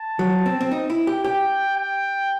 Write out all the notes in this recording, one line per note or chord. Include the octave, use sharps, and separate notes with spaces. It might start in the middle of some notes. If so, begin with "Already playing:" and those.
Already playing: A5
F#3
C4
C4
D#4
E4
G4
G4 G5
G5